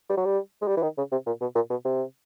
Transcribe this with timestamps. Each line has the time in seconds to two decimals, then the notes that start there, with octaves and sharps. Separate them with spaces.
0.10 G3
0.17 F#3
0.25 G3
0.62 G#3
0.68 G3
0.77 E3
0.83 D#3
0.98 C#3
1.12 C3
1.27 A#2
1.41 B2
1.55 A#2
1.70 B2
1.85 C3